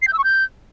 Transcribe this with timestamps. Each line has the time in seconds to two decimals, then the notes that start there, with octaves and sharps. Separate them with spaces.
0.02 C7
0.07 G6
0.13 E6
0.18 C#6
0.24 G6